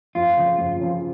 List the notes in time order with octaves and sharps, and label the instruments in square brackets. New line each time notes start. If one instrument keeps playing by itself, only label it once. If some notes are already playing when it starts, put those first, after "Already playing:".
[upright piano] F2 [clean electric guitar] F4
[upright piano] C#3 F3
F2
C#3 F3